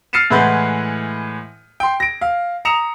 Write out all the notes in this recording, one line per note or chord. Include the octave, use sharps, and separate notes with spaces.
F6 A6 C7 C#7 D#7 E7
A2 E3 G#3 B4 F#5 G6
G5 C6
A#6 D7
F5
A#5 D#6 C#7 E7 F7